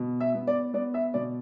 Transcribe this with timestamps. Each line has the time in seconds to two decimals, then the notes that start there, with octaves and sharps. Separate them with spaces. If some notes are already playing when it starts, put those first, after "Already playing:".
Already playing: B2
0.20 E5
0.34 B3
0.47 D5
0.74 B3 D5
0.94 E5
1.14 B2 D5